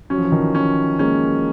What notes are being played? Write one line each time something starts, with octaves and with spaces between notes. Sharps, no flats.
F#3 C#4
F3
E3
D#3 F3
C#4
G#3 A#3 C#4